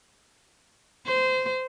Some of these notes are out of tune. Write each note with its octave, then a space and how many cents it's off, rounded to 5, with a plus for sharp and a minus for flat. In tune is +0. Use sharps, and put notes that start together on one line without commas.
C5 -20